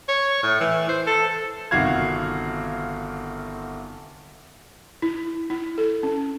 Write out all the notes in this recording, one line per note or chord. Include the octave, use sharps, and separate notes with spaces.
C#5
A2
E3
C5
A4
G1 C3 D#3 F#4 F5 G#6
E4
E4
A4
C#4